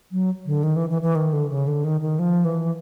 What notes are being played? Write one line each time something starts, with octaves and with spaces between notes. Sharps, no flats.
F#3
D3
D#3
E3
E3
E3
D#3
D3
C#3
D3
D#3
D#3
F3
E3